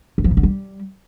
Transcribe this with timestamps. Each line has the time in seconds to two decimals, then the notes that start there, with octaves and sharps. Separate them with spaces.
0.18 D#3
0.24 F3
0.31 A#2
0.37 D3
0.43 G3